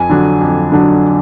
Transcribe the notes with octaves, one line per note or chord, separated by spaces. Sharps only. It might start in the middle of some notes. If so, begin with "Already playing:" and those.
Already playing: F2 G#5
D3 F#3 D4
F2
D3 F#3 D4